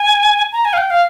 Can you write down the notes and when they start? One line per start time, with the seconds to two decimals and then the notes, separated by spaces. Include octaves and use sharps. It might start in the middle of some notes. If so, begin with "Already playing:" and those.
Already playing: G#5
0.52 A#5
0.65 G#5
0.73 F5
0.78 G5
0.90 F5